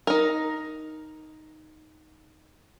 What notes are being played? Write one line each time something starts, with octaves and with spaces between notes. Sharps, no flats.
D#4 A#4